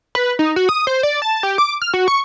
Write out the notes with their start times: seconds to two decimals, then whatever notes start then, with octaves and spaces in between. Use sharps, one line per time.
0.15 B4
0.39 D#4
0.56 F#4
0.69 D#6
0.87 C5
1.03 D5
1.22 A5
1.43 G4
1.58 D6
1.82 F6
1.94 F#4
2.08 C#6